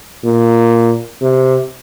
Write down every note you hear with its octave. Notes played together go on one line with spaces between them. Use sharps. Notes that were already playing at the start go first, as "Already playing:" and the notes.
A#2
C3